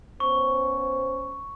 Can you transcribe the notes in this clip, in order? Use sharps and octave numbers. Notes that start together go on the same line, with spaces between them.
B3 C#4 C5 C#6